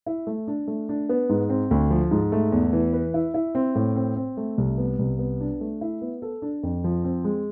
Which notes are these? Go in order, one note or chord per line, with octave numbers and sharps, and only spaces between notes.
E4
A3
D4
A3
D4
B3
G#2
C4
D2
F3
G#2
A3
E2
E3
B4
E4
E4
C4
A2
C4
C4
A3
C2
B3
C2
B3
D4
A3
E4
B3
A4
D4
F2
F3
C4
G#3